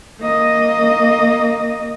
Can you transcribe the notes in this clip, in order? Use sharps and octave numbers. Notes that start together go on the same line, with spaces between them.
A#3 D#5